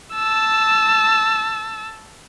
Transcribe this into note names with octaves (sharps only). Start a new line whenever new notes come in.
A5 E6